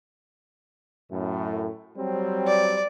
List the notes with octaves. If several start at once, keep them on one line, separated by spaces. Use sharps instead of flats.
F#2 A2
F#3 G3 C4
D5